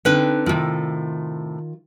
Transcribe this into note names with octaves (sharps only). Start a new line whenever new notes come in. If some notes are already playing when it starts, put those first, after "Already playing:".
D3 C4 D#4 B4 G5
A2 C3 D#3 F4 G5